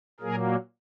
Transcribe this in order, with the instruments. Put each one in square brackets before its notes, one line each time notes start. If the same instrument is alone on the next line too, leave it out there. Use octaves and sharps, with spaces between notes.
[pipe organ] A#2 F#3 A#3 G#4 A#4